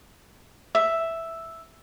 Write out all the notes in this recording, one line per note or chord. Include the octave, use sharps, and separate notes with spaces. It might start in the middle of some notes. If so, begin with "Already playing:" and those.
E5